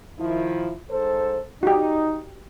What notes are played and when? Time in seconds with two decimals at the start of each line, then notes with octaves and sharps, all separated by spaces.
0.19 D#3 F3 E4
0.90 G#2 A4 C5
1.63 D#4 F#4 G4